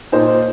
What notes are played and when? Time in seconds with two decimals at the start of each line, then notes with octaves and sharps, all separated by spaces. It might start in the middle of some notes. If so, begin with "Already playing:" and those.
0.12 A#2 A#3 D#4 C5